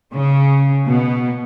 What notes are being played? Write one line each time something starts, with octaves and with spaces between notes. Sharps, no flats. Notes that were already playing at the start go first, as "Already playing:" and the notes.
C#3
B2